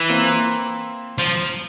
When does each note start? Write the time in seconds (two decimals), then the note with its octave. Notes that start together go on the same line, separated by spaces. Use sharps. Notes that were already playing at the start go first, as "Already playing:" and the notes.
Already playing: E3
0.09 A#3 C4
1.18 F3